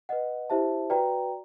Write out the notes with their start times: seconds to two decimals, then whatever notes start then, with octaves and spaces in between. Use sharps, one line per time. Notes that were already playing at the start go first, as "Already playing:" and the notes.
0.09 B4 D#5 F#5
0.50 E4 G4 C5 E5 A5
0.90 F#4 B4 D5 G5 A#5